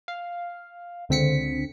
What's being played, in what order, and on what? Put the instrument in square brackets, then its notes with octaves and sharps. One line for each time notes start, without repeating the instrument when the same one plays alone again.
[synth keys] F5
C#2 D3 C4 B6 C#7